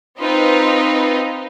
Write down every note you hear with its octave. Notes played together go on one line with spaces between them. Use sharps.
C4 D#4 F4 B4